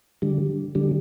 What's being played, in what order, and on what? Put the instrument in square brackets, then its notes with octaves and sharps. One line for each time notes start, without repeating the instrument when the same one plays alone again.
[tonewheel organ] D3 G3
D3 G3